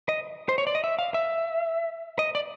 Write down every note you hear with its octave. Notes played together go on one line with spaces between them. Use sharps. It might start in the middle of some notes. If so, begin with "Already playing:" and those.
D#5
C5
C#5
D5
D#5
E5
F5
E5
D#5
D5